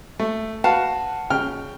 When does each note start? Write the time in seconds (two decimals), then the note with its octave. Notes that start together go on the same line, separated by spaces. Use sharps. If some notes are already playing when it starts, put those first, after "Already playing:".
0.20 A3
0.64 F#4 B4 F5 A5
1.30 C#3 G5 F6